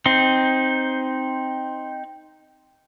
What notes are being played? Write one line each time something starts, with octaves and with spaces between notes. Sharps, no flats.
C4 D#4